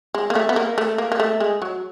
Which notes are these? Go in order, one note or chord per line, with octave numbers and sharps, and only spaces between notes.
G#3
A#3
A3
B3
A#3
A3
A#3
A#3
A3
G#3
F#3